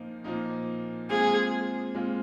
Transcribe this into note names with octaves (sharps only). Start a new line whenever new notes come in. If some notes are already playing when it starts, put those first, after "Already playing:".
Already playing: A#2 F3 A#3 D#4
A#2 F3 A#3 D#4
A#2 G#3 C4 F4 G#4
A#2 G#3 C4 F4